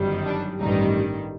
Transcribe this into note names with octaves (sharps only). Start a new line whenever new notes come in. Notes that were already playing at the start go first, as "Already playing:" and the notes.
Already playing: G1 F#2 D#3 G3
D4
A1 G2 D#3 G3 D#4